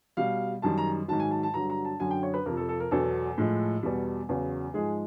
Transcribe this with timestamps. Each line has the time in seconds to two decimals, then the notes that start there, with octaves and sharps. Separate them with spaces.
0.17 B2 G3 F5
0.62 F#2 D#3 G3 A5
0.78 A#5
1.08 G#2 D#3 F#3 A5
1.20 G#5
1.31 A5
1.43 A5
1.54 G2 D3 F#3 A#5
1.70 A#5
1.85 A5
2.00 F#2 D3 F#3 G#5
2.11 G5
2.23 C#5
2.34 B4
2.46 F2 C3 F3 A#4
2.57 A4
2.68 A4
2.80 A#4
2.91 E2 B2 F#3 A4
3.38 A2 F3 G#3
3.83 E2 B2 G3
4.29 E2 C#3 F#3
4.74 G#2 F3 G#3 G#4